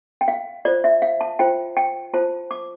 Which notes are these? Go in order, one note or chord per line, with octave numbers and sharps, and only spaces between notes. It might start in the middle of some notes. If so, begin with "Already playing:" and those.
G5
F5
F4 C5 D5
E5
F5
A5
F4 C5 G5
G5
F4 C5 A5
D6